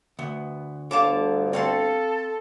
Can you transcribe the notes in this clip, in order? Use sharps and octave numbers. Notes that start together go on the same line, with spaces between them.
D2 B3
G1 D2 G2 D3 C#5 F5 A5 D6
C4 A4 C#5 F5 C6